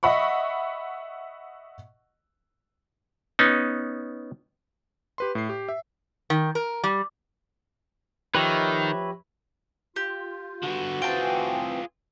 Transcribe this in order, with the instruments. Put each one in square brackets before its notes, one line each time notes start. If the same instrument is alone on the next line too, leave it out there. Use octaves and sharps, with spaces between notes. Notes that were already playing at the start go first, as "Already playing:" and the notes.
[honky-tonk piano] D#5 E5 F#5 B5 C#6
[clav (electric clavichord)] B3 C#4 D#4
[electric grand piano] G4 B4 C6
A2 C7
G4
E5
[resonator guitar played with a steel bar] D#3
A#4
G3
[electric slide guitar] D#3 [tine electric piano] F3 G4 A#6 [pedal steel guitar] B4 C#5 E5
[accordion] F4 [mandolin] G4
[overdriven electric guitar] D3 B3 [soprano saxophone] F#4
[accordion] E3 C4 [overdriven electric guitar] F4 G#4 [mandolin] G5 A5